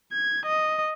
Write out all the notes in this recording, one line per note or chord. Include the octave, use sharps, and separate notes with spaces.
G#6
D#5